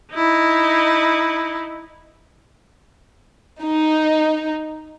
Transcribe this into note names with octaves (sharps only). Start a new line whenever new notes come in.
D#4 E4
D#4